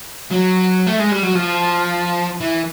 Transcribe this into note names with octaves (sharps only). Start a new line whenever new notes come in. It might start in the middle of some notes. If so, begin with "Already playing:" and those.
F#3
A3
G#3
G3
F#3
F3
E3